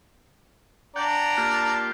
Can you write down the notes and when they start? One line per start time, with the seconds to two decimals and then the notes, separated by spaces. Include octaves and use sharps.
0.96 D4 D5 F#5 G5 A#5
1.37 A#3 F4 G4